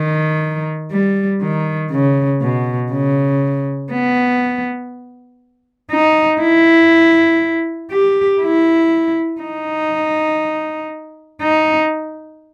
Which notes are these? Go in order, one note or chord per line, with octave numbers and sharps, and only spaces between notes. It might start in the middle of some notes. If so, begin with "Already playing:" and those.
Already playing: D#3
G3
D#3
C#3
B2
C#3
B3
D#4
E4
G4
E4
D#4
D#4